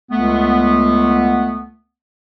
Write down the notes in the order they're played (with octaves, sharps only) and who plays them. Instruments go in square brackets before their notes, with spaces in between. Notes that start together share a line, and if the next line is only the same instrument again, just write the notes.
[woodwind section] C#2 A3 B3